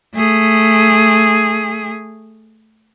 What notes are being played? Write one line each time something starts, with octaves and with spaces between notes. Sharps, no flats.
A3 G#4